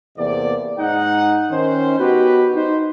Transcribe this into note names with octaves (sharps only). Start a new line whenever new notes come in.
E2 C3 A#3 D5
G#2 D#4 F#5
D#3 C#4 C5
B3 D#4 F#4 G4 B4
D#4 C5